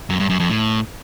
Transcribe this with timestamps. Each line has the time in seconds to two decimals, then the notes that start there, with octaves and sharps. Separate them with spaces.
0.10 F#2
0.20 G2
0.30 F#2
0.40 F2
0.50 A2